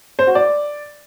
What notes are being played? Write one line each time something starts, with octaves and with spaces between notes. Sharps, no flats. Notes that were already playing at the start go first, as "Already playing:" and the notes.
C5
F#4
D5